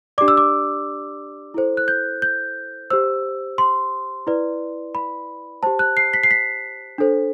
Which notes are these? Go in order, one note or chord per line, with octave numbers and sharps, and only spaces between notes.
D4 G4 D5 D6
E6
D6
E4 A4 C5
F#6
G6
G6
G4 C5 E6
C6
E4 B4 D5
B5
G4 C5 A5
F#6
C7
B6
C7
B6
D4 A4 C5